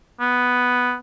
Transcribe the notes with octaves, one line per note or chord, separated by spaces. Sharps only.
B3